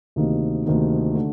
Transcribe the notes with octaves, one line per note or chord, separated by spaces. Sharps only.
D2 C3 D#3 A#3 D#4
D2 C3 D#3 A#3 D#4
D3 A3